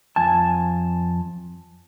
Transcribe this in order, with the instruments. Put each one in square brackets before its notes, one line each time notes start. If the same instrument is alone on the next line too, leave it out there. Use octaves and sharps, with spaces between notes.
[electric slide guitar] F2 G#5 A5